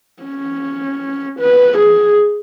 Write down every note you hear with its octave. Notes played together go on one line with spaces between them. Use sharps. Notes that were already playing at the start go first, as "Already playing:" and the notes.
C#4
B4
G#4